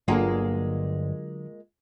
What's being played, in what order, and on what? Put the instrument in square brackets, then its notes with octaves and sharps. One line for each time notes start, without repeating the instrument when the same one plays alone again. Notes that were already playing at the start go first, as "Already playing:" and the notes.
[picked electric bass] G1 [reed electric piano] D3 F#3 [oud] G#3 A#3 F4